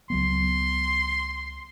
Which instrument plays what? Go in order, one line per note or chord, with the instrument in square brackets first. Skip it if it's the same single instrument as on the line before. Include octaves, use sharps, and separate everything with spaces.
[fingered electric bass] C#2 F#3 B3 [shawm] C6